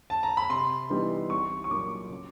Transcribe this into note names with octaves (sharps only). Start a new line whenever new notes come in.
A5
A#5
B5
C3 C6
E3 G3 B3 D#4
C2 C#6
C#6
A#2 F#3 A#3 D6
C#3